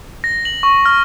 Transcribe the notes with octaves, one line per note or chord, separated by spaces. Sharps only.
A#6
F#7
C#6
F6